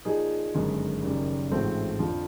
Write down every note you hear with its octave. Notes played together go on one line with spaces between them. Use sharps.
A#2 F3 A#3 D#4 G#4
G1 F#2 D#3 G#3
F#1 F#2 D#3 G3
A1 G#2 F3 A3 C4
F2 D3 F3